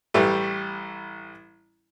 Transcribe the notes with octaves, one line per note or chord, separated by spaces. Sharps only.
A1 E3 G3 A3